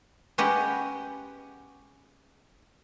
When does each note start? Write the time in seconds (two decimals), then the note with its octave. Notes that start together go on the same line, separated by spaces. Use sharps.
0.38 G#3 B3 C#4 G4 D#5 F#5